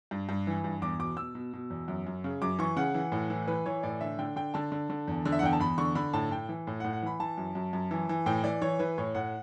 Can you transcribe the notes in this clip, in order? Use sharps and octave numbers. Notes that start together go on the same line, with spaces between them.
G2
G2
E3
G2
E2 D6
B2 D6
B2 E6
B2
B2
E2
F#2
F#2
C#3
F#2 D6
E3 C#6
C#3 F#5
E3
A2
E3
E3 B4
E3 C#5
A2 D5
D3 E5
D3 G5
D3 G5
D3 A5
D3
D3
E2
D3
E5
F#5
E2 G5
A5
E2 B5
D3 C#6
D3 B5
A2 A5
A2 G5
E3
A2
F#5
A2
F#5
E3 B5
E3 A5
F#2
F#2
F#2
E3
E3
A2 G5
E3 D5
E3 C#5
E3 B4
A2 C#5
A2 F#5